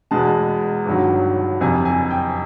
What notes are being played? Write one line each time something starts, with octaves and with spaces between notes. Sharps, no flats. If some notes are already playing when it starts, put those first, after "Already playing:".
E2 B2 G#3 A5
G1 G2 D#3 F#3
F#1 F2 C3 G#5
G#5
G5